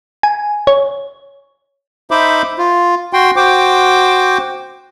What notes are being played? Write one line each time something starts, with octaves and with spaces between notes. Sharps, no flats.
G#5
C#5
D#4 C5 E5 B5 D6
F4
F#4 G5 C6
F#4 C5 G5 D6